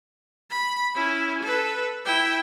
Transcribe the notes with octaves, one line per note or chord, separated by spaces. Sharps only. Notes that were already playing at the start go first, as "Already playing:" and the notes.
B5
C#4 E4
A4 B4
E4 G5